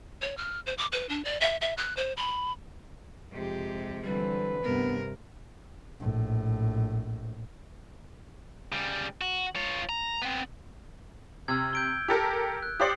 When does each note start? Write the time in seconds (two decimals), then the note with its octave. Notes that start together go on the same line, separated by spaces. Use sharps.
0.22 C#5
0.37 F6
0.67 C5
0.78 D6
0.92 B4
1.09 D4
1.25 D5
1.41 E5
1.61 E5
1.77 F#6
1.97 C5
2.17 B5
3.32 F2 C3 G#3 G4
4.04 D3 E3 G3 C4 B4
4.64 D2 G2 C3 B3 A#4
6.00 A#1 A2
8.72 C#3 G3
9.21 F#4
9.56 F4 C#5
9.89 A#5
10.22 B3 C4
11.48 C3 E6 F6 G#6
11.73 G6 D7 G7
12.08 G4 A4 A#4
12.63 F#6
12.80 G4 C5 D5 D#6 C7 C#7